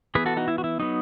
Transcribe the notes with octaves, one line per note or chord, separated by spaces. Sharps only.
E3 B3 G#4 B4
F#4 A4
D#4 F#4
E4
F#4
E4
F#3 B3 D#4